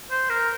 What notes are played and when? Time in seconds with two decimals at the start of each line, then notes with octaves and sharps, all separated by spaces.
0.11 C5
0.30 A#4